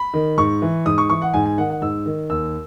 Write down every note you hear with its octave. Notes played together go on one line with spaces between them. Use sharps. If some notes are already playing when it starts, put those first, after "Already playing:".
Already playing: B5
D#3
G#2 C#6
E3
G#2 D#6
C#6
E3 C#6
F#5
G#2 G#5
G#5
D#3 F#5
F#5
G#2 E6
D#3
D#2 E6